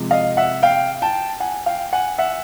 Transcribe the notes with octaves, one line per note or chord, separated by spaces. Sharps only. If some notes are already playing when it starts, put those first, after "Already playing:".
Already playing: C3 F3 G#3
D#5 F5
E5 F#5
F5 G5
G5 A5
F#5 G#5
F5 G5
F#5 G#5
E5 F#5